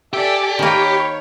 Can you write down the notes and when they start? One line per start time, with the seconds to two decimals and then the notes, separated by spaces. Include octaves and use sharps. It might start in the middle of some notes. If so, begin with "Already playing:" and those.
0.13 G4 A4 D5 E5 G#5
0.59 D#3 A#3 C#5 G5 B5